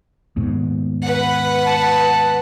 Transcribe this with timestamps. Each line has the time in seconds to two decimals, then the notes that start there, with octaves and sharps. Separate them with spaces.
0.37 D#2 G#2 B2
1.04 B4 F#5
1.67 A5